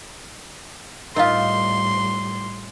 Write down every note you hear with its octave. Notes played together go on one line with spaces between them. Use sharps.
A2 G3 D#4 F4 A#4 D#5 F5 C6